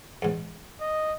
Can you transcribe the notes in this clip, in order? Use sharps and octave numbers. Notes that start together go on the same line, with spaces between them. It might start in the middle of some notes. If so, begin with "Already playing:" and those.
E2 G#2
D#5